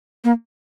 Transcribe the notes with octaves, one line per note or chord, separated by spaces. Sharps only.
A#3